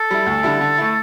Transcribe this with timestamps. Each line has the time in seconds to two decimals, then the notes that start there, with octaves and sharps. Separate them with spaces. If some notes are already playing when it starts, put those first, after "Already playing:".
Already playing: A4
0.11 G3 E4
0.26 D2
0.43 D3 G3 E4
0.61 D3
0.78 A3 E4